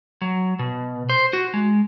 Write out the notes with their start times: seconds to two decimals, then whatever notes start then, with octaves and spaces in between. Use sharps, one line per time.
0.22 F#3
0.59 B2
1.10 C5
1.33 F#4
1.54 G#3